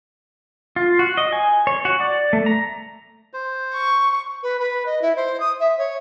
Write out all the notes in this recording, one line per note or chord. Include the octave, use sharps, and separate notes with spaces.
F4
F#4
D#5
G#5
C#5
F#4
D5
A3
A#5
C5
C#6
B4
B4
D#5
E4
C5
D#6
E5
C#5